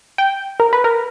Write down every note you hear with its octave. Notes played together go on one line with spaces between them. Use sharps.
G5
A#4
B4
A#4